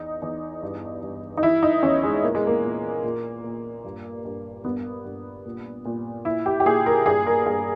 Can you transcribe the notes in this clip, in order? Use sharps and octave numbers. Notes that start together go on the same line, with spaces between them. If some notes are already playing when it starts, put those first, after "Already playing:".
Already playing: E2 D#4
E2
G2
G2
D#4
E3 E4
D#4
E2 C#4
G#3
A#2 A#3
G#3
A#3
A#2
A#2
A#2
G2
G2
G2 B3
G2
A#2
A#2
A#2 E4
G4
G4
A#2 G#4
A#4
G2 G#4
A#4
G2 G#4